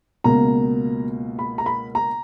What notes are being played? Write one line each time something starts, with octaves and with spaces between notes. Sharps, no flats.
C#2 B2 A#3 A#5
B5
A#5
B5
A#5